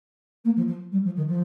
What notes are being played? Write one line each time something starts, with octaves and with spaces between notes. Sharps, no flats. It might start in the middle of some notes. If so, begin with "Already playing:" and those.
A#3
F3
F3
G3
F3
D#3
F3